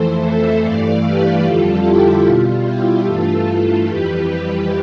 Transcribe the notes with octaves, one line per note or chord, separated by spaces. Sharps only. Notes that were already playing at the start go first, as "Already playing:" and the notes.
Already playing: F2 E3 A3 A4 C5
C5 E5
G2 E3 A3 D5 F5
G4 B4
F2 D3 G3 F4 A4
E4 G4
B2 G3 F4
E4 G4
G2 E3 A3 F4 A4
F2 E3 G3 G4 B4
G4 B4